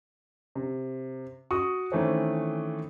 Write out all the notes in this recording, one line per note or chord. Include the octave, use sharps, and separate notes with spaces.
C3
F#4 C#6 D#6
D#3 E3 A3 C4 C#4